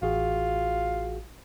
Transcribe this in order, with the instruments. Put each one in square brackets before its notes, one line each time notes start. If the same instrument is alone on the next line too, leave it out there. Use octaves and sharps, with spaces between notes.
[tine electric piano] A1 F#4 G#4 [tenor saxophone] F4